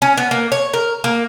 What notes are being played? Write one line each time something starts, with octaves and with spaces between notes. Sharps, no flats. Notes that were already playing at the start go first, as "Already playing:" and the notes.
C#4
B3
A#3
C#5
A#4
A#3